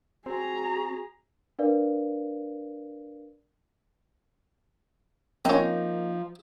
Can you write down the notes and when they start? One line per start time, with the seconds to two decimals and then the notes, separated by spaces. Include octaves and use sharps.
0.26 C4 F#4 G#4 A#5
1.59 D4 A#4 B4 D5 F5
5.45 F3 A#3 C4 C#4 D#4